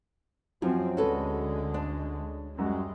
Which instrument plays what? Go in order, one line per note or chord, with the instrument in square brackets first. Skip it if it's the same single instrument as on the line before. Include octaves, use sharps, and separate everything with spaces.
[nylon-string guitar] F#2 [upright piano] F3 F#3 [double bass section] C4
[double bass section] D2 D3 G#3 [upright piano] C#4 [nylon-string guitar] F#4 A4 B4
[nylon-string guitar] D4
[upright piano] F#2 F#4 [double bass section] G3 G#3